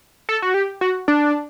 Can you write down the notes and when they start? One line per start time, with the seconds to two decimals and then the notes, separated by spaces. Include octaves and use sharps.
0.29 A4
0.42 F#4
0.54 G4
0.81 F#4
1.08 D4